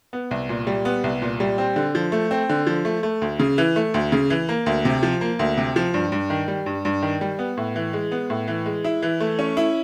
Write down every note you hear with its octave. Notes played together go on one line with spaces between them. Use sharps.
B3
C2
A#2
G3
B3
C2
A#2
G3
C4
D3
F3
A3
C4
D3
F3
A3
A3
D2
C#3
E3
A3
D2
C#3
E3
A#3
D2
C3
F3
A#3
D2
C3
F3
G2
G2
D#3
G3
G2
G2
D#3
G3
B3
A2
E3
G#3
B3
A2
E3
G#3
E4
E3
A3
C#4
E4